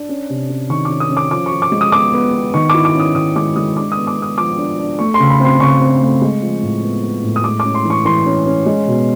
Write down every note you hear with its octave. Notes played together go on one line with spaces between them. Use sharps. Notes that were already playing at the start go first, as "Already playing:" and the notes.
Already playing: D4
C#4
C3
C#4
D#3 C#6
D6
C#4
D#6
C#4
D6
F3 D6
C#6
F3
D6
G#3
D#6
B3 D6
B3
B3
D#3 C#6
E4 D6
D6
C#4 D#6
D#3 D#6
G#3 D6
G#3 D#6
D4 D6
B3 D#6
D6
B3 D#6
F3 D6
D4
D4
A3 C#6
C6
C#3
B5
C4 C6
C#3 C#6
C4
A3
G#3
F3
A2
B3
B3
A2
D#6
G#3 D6
C#4 D6
C6
E3
C#6
E3 C6
C#4
C#4
G#3
B2